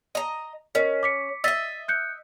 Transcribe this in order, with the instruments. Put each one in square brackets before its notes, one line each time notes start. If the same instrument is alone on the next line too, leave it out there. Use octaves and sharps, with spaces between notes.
[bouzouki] D#5 A#5
[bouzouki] C#4 [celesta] A#4 D#5
[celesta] D6 B6 C#7
[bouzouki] D#5 E5 [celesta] E6 A6 B6
[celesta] F#6 G6 C#7